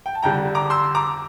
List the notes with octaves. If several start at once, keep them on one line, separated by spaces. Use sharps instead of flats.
G5
A5
F2 D3 G3 G5 A#5
A#5 D6
C6 E6
A#5 D6